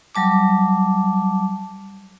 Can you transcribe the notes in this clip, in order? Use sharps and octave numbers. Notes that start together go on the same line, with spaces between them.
F#3 G3 A5 D6